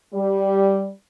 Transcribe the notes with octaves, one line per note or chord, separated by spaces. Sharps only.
G3